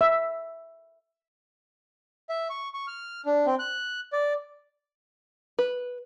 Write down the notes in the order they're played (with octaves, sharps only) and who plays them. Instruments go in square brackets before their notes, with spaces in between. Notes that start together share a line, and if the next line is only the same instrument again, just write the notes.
[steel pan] E5
[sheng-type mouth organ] E5
C#6
C#6
F6
D4
C4
F#6
D5
[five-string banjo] B4